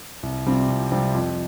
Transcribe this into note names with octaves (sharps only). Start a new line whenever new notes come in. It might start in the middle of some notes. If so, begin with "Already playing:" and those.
C2
C3 G3 C4 F4
C2
C3 G3 C4 F4
F2